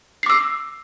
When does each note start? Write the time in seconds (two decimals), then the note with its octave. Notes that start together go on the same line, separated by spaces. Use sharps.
0.23 C7
0.26 D6
0.30 E6